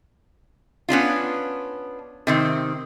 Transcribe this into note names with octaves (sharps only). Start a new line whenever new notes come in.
B3 C#4 D4 F4
C3 D#3 C4